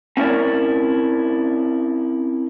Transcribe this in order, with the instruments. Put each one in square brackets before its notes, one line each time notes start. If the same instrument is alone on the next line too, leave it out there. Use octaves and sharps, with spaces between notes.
[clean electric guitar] C4 C#4 E4 A#4 C#5 D5